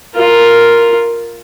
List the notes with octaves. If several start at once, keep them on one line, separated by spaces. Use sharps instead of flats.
F4 A#4